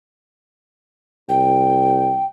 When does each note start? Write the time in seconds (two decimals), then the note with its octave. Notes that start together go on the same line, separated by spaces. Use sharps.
1.29 C2 G5